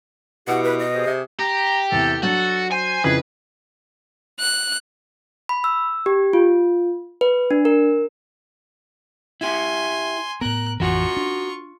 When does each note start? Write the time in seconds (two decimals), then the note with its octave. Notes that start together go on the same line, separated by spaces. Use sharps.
0.48 B2 E4 G4 F#5
0.64 B4
0.79 D#5
0.93 G4 G#4 C5
1.06 C3
1.39 G4 A#5
1.92 E2 C3 A4
2.23 F#3 D4 F#4 A4
2.72 C5 G#5
3.04 F2 C#3 E4 G#4 B4
4.41 F#6
5.49 B5
5.64 E6
6.06 G4
6.33 F4
7.21 B4
7.51 D4
7.65 A#4
9.41 E4 G4 G#5 C6
10.41 A2 B3 A#4 F#6
10.80 A1 F2 E3 F4 F#4 A#4 C#6
11.17 D4